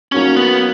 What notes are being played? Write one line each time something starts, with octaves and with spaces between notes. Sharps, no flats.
F#3 A#3 C#4 D#4 F#4 C#5
B3